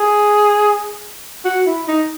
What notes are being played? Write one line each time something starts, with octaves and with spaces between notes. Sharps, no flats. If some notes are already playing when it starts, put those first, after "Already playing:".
Already playing: G#4
F#4
E4
D#4